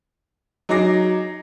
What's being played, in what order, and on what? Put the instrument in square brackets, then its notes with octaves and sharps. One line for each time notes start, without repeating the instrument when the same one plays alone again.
[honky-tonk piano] F#3 D#4 G#4 D6 A#6 C7